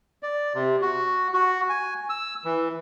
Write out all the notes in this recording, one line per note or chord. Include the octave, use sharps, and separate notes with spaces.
D5
C3
F#4
F#4
G#5
E6
E3